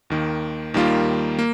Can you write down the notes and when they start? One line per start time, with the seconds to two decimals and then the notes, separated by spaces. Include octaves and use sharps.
0.10 D#2 D#3 A#3
0.74 D#2 D#3 G3 A#3 F4
1.39 A#3